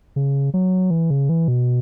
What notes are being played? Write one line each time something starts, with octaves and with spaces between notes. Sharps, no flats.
C#3
F#3
E3
C#3
E3
B2